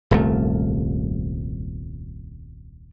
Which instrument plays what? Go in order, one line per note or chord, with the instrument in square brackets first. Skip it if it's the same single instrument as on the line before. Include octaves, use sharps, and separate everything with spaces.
[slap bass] D#1 C2 F#2 A3